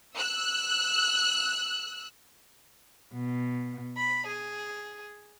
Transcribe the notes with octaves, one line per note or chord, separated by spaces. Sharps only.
E6 F#6
B2
B5
G#4